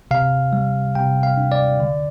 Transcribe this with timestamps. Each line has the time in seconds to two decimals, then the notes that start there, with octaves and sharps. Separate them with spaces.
0.11 C3 F5
0.53 G3
0.95 C3 G5
1.23 F5
1.37 D4
1.52 D5
1.80 D3